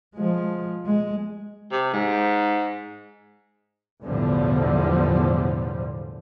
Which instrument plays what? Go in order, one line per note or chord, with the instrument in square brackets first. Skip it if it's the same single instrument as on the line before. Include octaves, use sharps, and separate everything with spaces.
[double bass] F3 G#3
G#3
[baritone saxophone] C3
G#2
[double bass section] B1 E2 A2 D3 F3 G3